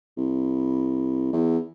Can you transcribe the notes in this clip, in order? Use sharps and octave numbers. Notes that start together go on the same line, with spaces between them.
C2
E2